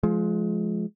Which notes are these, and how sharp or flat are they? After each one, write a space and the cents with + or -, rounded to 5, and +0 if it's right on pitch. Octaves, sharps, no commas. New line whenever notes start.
F3 +0 G#3 +25